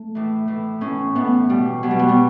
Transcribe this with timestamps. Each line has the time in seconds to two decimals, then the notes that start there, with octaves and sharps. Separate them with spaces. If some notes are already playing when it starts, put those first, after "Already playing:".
Already playing: A3
0.15 A2 E3
0.48 A2 E3
0.81 A2 E3 C#4
1.15 A2 E3 B3
1.49 B2 G3
1.83 B2 F#3
1.91 G3
1.99 B3
2.09 G3